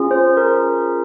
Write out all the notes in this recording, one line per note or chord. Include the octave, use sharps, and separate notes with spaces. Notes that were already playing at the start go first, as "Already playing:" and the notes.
Already playing: C#4 F4 G#4
C5
A#4